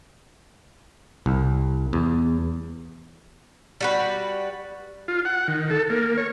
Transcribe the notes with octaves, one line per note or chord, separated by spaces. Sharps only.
C2
E2
G3 F#4 B4
F4
F#5
D#3
A4
A#3
C#5